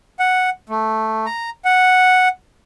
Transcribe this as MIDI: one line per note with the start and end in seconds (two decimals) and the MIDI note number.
0.19 0.50 78
0.70 1.26 57
1.26 1.50 82
1.65 2.28 78